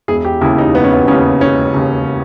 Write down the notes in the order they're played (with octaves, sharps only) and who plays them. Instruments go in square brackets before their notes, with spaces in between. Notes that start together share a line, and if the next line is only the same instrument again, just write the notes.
[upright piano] E1 G#4
G4
D#2 C#3 E4
D#4
E1 B3
C#4
B3
D#2 C#3 C#4
E1 C#4
D#2 C#3